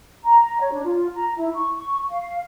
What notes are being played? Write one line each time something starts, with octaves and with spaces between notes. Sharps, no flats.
A#5
C#5
D4
F4
A#5
E4
C#6
C#6
F5